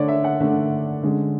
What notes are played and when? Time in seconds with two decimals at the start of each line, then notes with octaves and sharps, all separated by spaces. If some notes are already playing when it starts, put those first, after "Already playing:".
Already playing: D3 A3 D4 C#5 D5
0.08 E5
0.24 F#5
0.40 D3 A3 D4 E5
1.03 D3 G#3 C#4